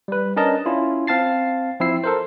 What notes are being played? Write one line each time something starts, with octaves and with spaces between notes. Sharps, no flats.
G3 B4
C#4 D4 A#4 D#5 A5
C#4 E4 F4
C4 F5 A5 A6 C7
F3 C4 E4 E6 C7
A4 A#4 C5